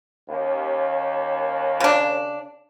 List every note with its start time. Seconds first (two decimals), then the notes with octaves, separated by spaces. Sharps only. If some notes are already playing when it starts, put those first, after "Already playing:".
0.29 D#2 C#4
1.80 C#3 D4